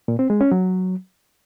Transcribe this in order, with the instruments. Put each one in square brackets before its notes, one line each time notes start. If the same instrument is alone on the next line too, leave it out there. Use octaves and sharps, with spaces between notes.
[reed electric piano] A#2
C4
G#3
C#4
F#3